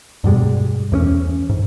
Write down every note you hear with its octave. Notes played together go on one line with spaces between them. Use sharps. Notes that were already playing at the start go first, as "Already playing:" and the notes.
G2 B2 G3 G#3
E2 A#3 C#4
G#2